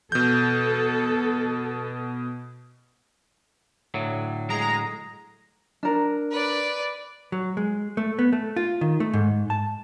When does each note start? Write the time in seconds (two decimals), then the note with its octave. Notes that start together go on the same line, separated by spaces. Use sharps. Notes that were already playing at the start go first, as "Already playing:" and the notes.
0.12 B2 A4 G6
3.94 A2 D3 F#3
4.50 G#3 A#5
5.83 D4 A#4
6.32 B4 D5
7.32 F#3
7.57 G#3
7.97 A3
8.19 B3
8.32 A3
8.56 F4
8.81 D#3
9.00 A3
9.13 G#2
9.50 A5